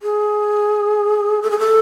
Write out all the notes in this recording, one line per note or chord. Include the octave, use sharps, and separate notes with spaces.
G#4
A4
G#4
A4